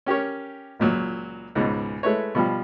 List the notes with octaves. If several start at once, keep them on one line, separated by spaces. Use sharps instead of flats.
C#4 G4 A#4 C#5
C#2 A#2 F#3
C#2 G#2 B2
G#3 A3 E4 B4 C#5
B2 F3 G3